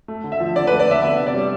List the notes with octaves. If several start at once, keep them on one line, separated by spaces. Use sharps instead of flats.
A3
D3
E5
F3
D3 D5
A3 B4
D5
D3 E5
B3 E5
C3
D5
G3